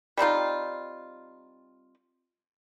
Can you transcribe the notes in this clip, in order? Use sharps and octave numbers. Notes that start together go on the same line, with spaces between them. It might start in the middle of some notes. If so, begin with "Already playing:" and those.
G3 C4 D#4 F4